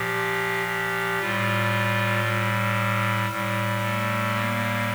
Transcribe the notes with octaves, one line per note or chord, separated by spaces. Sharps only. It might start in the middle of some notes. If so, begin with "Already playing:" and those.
Already playing: A#2 F3 G4
G4
A2 G3 F4
G3
A2 G3
A3
A#3